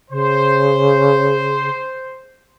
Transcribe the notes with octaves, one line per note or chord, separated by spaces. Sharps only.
C#3 C5